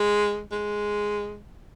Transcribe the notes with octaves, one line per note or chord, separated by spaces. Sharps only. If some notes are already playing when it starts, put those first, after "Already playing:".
Already playing: G#3
G#3